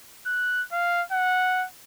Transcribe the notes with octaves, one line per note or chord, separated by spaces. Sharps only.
F#6
F5
F#5